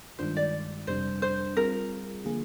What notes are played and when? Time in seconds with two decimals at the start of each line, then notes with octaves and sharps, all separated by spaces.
0.19 G2 D#3 G#3 D4 F4 C5
0.37 D5
0.87 F2 C3 G3 D4 C5
1.22 C5
1.56 G3 C4 F4 G#4 A#4
2.24 D3 F3 A#3 F4 G#4